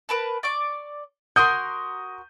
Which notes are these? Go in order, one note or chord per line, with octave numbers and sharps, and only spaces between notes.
A#4 B4 A5
D5 C#6 D6
F#4 A#4 C6 D#6 G6